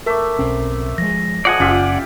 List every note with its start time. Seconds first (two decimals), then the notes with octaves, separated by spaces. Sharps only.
0.06 A3 A#4 E5 D6
0.39 B1 C4 C#4
0.98 F3 G#3 A#6
1.45 F3 G#3 D5 F#5 G#5
1.60 F#1 C#4 F4 G4 E5